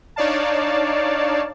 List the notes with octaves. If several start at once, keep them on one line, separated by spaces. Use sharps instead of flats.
D4 D#4 C#5 D5 F5 A5